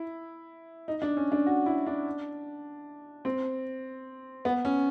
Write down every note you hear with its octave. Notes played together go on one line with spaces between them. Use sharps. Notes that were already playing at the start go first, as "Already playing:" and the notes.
Already playing: E4
D#4
D4
C#4
D4
F#4
E4
D4
C4
B3
C#4